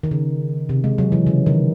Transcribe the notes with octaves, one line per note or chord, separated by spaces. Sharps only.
D#3
C#3
C3
G#3
F#3
E3
C#3
D#3